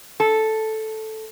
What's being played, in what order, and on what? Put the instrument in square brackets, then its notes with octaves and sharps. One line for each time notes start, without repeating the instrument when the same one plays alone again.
[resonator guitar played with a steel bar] A4